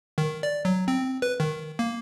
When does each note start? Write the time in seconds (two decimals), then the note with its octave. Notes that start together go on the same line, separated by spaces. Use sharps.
0.18 D#3
0.43 D5
0.65 F#3
0.88 C4
1.22 B4
1.40 D#3
1.79 A#3